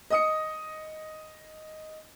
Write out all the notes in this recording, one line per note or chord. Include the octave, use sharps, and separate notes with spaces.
D#5 D#6 C#7